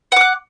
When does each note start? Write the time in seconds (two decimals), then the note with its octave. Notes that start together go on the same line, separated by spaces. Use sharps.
0.12 F#5
0.16 D6
0.21 F#6